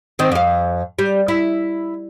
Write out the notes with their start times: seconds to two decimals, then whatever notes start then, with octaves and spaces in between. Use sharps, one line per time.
0.19 D#3 C4
0.32 F2 F5
0.99 G3
1.28 E4